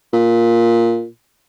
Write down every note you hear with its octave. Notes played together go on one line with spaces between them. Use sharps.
A#2